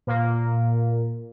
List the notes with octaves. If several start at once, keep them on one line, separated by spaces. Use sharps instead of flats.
A#2 A#3